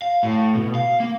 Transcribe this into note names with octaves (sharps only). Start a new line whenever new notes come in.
F5
A2
B2
F5
A#3